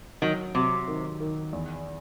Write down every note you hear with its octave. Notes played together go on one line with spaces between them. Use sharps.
D#3 F#3
C3 F#3
D#3
D#3
E2